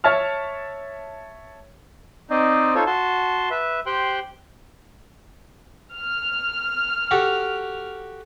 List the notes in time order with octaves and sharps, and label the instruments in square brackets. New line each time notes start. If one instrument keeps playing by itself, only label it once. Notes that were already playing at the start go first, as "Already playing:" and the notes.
[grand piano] C#5 E5 A5 F6
[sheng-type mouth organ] C4 D#4 C5 D5 D#5
D#4 F4 A4 C5 C#5
F#4 A5 C6
B4 E5
G4 C5 G5 C6 F#6
[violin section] F6
[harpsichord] F#4 G4 A4